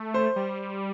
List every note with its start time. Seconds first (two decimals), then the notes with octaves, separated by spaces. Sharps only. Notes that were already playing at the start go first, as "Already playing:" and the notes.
Already playing: A3
0.14 C5
0.36 G3